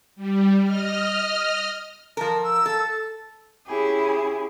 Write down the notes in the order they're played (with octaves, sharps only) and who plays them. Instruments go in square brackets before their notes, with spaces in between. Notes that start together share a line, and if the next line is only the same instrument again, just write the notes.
[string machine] G3
D#5 F6
[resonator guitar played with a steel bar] F3 A#4 [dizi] A5
[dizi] E6
[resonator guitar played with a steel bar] A4
[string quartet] C#4 E4 G4 G#4